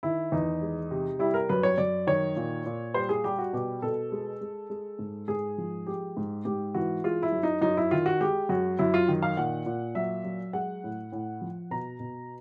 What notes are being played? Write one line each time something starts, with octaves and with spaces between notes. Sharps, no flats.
D#3 E4
E2 D#4
G#3
C3
G3 E4
A#4
F#2 B4
C#5
F#2 D5
D#3 C#5
A#2
A#2
G3 C5
G#4
G3 G4
F#4
B2 G4
B2 A4
G#3
G#3
G#3
G#2
G#2 G#4
F3
G#3 G4
G#2
G#2 G4
E3 F#4
G#3 F4
E4
F#2
D#4
F#2 D#4
E4
D#3 F4
F#4
G#3 G4
F#2 F#4
F#2 E4
F4
D#3
F5
A#2 F#5
A#2
F#3 E5
F#3
G#3 F#5
A2
A2
F3
B2 A#5
B2